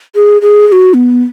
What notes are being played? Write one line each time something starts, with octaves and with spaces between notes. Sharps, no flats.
G#4
G#4
G#4
F#4
B3